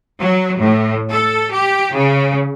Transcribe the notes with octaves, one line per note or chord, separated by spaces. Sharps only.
F#3
A2
A4
G4
C#3